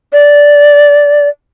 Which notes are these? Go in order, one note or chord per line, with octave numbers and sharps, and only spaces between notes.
D5